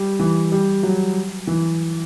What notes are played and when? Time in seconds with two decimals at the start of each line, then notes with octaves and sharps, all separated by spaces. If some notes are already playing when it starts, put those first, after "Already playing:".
Already playing: G3
0.19 E3
0.52 G3
0.83 F#3
1.47 E3